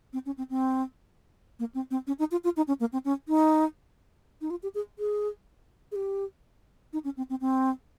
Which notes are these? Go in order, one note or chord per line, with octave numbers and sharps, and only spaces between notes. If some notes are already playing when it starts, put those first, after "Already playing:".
C4
C#4
C4
C4
A#3
C4
C4
C#4
D#4
F4
F4
D#4
C#4
A#3
C4
C#4
D#4
D#4
F4
G4
G#4
G#4
G#4
G4
D#4
C#4
C4
C4
C4